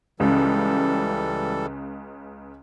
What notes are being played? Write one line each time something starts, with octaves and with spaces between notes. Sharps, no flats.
C#2 C#3 E3 G3 A4